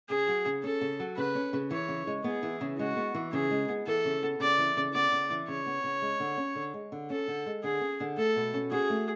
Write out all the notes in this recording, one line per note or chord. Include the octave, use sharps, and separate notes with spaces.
C#3 G#4
F#3
C#3
C#4 A4
C#3
F#3
C#3 B4
C#4
C#3
E3 C#5
C#3
G#3
B3 G#4
E3
C#3
G#3 F#4
B3
E3
C#3 G#4
G#3
B3
E3 A4
C#3
B3
C#3 D5
E3
C#3
B3 D5
C#3
E3
C#3 C#5
B3
C#3
G#3
D3
C#4
D3
G#3
D3
C#4 A4
D3
G#3
D3 G#4
C#4
D3
A3 A4
B2
C#4
F#4 G#4
A3